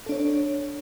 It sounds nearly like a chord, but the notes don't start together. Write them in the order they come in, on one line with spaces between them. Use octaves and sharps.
A4 D4 C#5